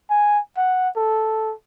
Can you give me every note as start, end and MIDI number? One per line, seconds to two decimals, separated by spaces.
0.10 0.39 80
0.57 0.89 78
0.96 1.53 69